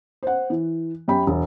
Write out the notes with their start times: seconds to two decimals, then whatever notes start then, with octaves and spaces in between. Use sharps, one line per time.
0.23 C5 F#5
0.50 E3
1.08 F#2 G4 G5 B5
1.27 E1